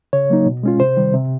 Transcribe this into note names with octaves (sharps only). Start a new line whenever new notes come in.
C#3 C#5
F#3 A#3 D#4
B2
G#3 C#4 F4
C3 C5
D#3 G3
C3